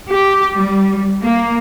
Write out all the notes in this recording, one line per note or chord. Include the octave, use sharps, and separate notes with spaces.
G4
G3
A#3